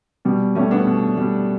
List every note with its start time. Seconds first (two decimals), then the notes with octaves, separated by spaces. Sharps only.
0.25 B2 G3
0.55 G3 A3 C#4
0.71 B3 D4
0.87 B2
1.18 G3